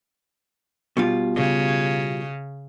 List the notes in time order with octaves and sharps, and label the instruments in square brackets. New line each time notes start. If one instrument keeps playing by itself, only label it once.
[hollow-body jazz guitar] B2 G3 F4
[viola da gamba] C#3